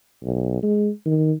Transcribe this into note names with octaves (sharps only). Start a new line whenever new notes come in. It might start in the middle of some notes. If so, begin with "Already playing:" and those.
B1
G#3
D#3